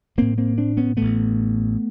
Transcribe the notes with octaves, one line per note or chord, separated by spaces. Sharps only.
A1 A2 A#3 C4
A#3 C4
C4 D4
B3 C#4
A1 A2 A3 B3